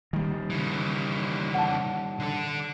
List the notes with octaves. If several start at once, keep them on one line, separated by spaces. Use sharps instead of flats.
D#3 G3
C#3 E3
F#5 A5
D3 A4